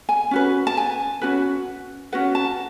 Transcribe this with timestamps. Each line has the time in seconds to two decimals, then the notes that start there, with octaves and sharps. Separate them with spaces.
0.09 G#5
0.31 C#4 F#4 B4
0.67 A5
0.77 G#5
1.21 C#4 F#4 B4
2.12 C#4 F#4 B4 F#5
2.35 A5